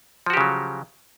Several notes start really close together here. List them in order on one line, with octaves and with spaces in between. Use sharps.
F3 F#4 G4 C#3 F#3